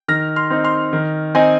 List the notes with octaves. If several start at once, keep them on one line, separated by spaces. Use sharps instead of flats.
D#3 F6 A#6
C6 F6
C4 D#4
C6 F6
D#3
C4 D#4 D#5 G#5